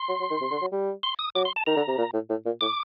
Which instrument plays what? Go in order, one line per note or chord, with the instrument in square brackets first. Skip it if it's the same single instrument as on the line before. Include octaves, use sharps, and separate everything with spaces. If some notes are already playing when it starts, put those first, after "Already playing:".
Already playing: [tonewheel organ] C6
[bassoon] F#3
F#3
D#3
C3
D3
F#3
G3
[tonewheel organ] C6
D#6
[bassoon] F#3 [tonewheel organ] D6
[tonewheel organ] C6
A5
[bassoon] D#3 [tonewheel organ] A#5
[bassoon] D3
C3
A#2
A2
A2
A#2
[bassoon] A2 [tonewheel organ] D6